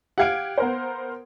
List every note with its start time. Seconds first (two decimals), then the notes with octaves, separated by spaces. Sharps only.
0.18 G4 F5 F#5 G#6 D7
0.58 B3 A#4 C5